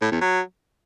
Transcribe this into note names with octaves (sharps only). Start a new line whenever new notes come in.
A2
E2
F#3